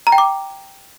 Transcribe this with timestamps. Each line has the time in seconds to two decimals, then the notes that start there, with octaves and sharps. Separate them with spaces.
0.07 A#5
0.12 G5
0.18 D6